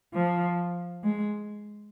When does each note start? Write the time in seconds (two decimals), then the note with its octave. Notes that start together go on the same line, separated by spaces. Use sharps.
0.16 F3
1.05 G#3